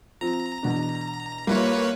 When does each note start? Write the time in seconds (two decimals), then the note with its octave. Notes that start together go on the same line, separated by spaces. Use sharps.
0.21 F3 C4 A#5
0.63 E2 B2 D4
1.47 G3 A#3 E4 F4 B4 C#5